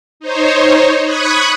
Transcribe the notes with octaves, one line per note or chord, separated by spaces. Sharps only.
D#4 C5 C#5
B5 C#6 D#6 F#6 G#6